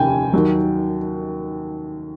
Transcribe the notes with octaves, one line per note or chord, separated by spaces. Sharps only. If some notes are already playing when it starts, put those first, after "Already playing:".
Already playing: F1 D#2 C#3 G5 G#5
D#2 D#3 F#3